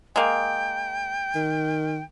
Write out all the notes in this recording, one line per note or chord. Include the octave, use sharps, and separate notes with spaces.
G#3 A#3 G5
D#3